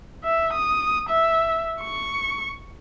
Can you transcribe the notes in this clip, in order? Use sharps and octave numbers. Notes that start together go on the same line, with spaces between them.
E5
D#6
E5
C#6